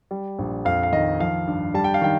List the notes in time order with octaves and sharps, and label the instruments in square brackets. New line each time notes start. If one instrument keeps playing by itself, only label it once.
[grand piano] G3
A#1
F2 F5
F5
D#3 D#5
F3 F5
G2
G3 A5
G5
F5
D#3 G5